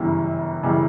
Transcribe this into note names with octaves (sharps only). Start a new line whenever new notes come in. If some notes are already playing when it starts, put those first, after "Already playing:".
Already playing: G1 F#2 C#3 E3 G3
F#2 C#3 E3 G3